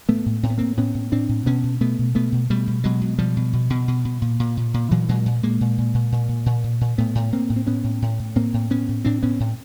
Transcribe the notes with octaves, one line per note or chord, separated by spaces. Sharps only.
A2 A3 B3
A2
A2 C4
B3
A2 A#3 C4
A2 B3 C#4
A2
A2 C4 D4
A2
B2 B3 C#4
B2
B2 A3 B3
B2
B2 A3 B3
B2
B2 G3 A3
B2
B2 F#3 G#3
B2
B2 F3 G3
B2
B2
B2
B2
B2
A#2
A#2
A#2
A#2
A#2 E3 F#3
A#2 F#3 G#3
A#2
A#2 G#3 A#3
A#2
A#2
A#2
A#2
A#2
A#2
A#2
A#2
A2 A3 B3
A2
A2 A#3 C4
A2
C4
A2 B3 C#4
A2
A2
A2
A2 A#3 C4
A2
A2 B3 C#4
A2
A2 C4 D4
A2 B3 C#4
A2